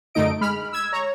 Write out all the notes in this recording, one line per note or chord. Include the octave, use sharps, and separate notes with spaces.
F#2 D3 A3 D#4 D#5 D7
G#3 B5 F6
E6 G#6
C#5 A#5